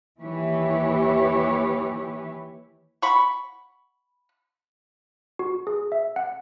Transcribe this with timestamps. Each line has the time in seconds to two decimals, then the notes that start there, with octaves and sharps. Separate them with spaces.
0.19 D#2 E3 E4 G4 B4 C#5
3.02 F#5 B5 C#6
5.39 F#4
5.67 G#4
5.92 E5
6.16 F#5